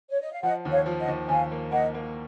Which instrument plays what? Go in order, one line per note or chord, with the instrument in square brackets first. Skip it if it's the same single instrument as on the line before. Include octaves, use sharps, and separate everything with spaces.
[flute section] C#5
D#5
F5
[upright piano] F3 [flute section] D#5 F#5
[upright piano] D#2
[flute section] C#5 F5
[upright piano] F3
[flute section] D#5 F#5
[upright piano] D#2
[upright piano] D#2 [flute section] F5 G#5
[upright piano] A#3
[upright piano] A#3 [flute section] D#5 F#5
[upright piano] A#3